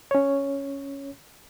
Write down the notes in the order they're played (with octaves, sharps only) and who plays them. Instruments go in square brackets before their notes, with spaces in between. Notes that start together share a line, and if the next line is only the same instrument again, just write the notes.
[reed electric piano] C#4 C#5